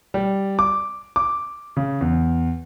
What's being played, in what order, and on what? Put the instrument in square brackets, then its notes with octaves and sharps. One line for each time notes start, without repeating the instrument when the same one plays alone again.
[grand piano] G3
D6
D6
C#3
E2